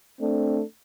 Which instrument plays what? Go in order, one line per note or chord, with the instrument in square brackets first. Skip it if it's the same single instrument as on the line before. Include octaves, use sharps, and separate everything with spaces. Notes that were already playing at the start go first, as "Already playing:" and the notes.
[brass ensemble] A3 C4 D4